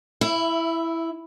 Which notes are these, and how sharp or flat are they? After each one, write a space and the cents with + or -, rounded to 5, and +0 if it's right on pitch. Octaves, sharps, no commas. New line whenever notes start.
E4 +0 E5 +25